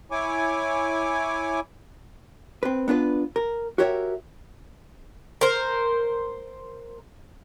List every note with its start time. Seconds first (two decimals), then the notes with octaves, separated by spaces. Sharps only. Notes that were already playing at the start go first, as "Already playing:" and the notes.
0.11 E4 C#5 G#5 D6
2.63 C4 B4
2.88 B3 D4 F4 B4
3.36 A#4
3.78 F#4 G4 A#4 C#5 E5
5.41 A#4 C5